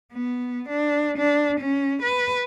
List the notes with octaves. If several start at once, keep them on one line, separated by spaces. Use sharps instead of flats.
B3
D4
D4
C#4
B4